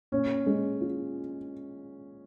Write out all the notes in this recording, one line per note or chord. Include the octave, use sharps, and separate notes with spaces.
A#2 C#4
G#3
F4